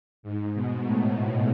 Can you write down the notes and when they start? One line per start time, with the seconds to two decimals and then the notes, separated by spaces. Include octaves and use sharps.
0.23 G#2
0.54 B2
0.84 A2
1.15 A2